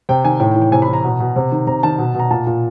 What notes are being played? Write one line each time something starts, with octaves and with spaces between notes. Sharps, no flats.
C3 G5
D#3 G#5
A2 G5
G5
E3
G5
C3 G#5
B5
E3
A#5
B2
B2
C3
D#3
C3 A#5
D#3 A5
B2
B2 A#5
A#2 A5
A#2